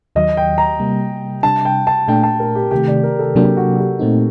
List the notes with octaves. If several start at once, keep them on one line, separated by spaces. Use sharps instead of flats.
D#2 D#3 F#3 D#5
G5
A#5
C3 G3 A#3
C3 G3 D4 A5
G5
A5
A#2 A3 D4 G5
A5
A#4
G4
C3 D#3 A3 G4
D5
A#4
A4
C3 F#3 A#3 D4 G4
F#4
G4
A#2 A3 C4 D#4